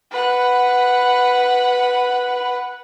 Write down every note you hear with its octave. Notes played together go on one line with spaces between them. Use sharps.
B4 F#5